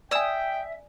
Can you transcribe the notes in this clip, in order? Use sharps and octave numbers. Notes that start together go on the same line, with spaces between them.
D5 E5 G5 G#5 D#6 E6